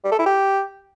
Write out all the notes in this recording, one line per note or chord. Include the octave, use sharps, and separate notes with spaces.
G3
A4
E4
G4